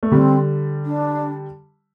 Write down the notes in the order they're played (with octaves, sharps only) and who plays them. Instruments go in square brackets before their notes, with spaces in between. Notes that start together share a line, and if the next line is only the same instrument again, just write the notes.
[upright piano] A3
[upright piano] D3 G3 [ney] C4
[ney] D4